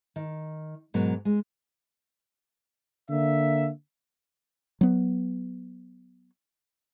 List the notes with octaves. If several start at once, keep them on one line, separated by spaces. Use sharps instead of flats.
D#3
G#2 B2 F#3 A#4
G#3
D3 A#3 E5
F#3 B3